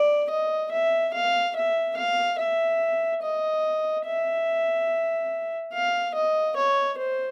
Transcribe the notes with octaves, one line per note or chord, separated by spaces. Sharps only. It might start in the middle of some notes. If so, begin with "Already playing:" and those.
Already playing: D5
D#5
E5
F5
E5
F5
E5
D#5
E5
F5
D#5
C#5
C5